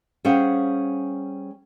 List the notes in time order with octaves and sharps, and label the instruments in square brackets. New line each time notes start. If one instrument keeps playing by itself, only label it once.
[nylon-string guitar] G3 C#4 G#4 C5 F5 F#5